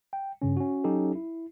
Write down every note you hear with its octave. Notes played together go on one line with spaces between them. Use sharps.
G5
G2 C#3 C#4
C#4 F#4
F#3 C#4 D#4 G4 A4
E4